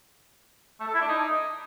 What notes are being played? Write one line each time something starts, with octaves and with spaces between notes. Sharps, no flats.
A3
A4
E4
D4
D#4